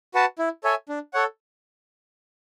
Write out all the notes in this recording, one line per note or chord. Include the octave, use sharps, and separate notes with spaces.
F#4 B4 F#5 A5
E4
A4 C#5 E5 G#5
D4
A4 C#5 F#5